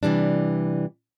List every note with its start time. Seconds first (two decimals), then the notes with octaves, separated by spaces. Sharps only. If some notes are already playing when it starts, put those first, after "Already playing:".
0.03 C3 E3 G3 D4